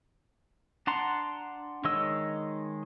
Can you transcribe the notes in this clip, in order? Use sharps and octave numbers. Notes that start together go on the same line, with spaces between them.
D4 F#5 A5 A#5 C6
D#3 G#3 C#5 D#5 E6